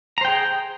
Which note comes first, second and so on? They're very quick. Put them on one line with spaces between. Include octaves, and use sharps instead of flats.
A#5 C5 G5 G#4